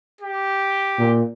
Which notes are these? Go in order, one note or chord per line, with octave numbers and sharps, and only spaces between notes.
G4
A#2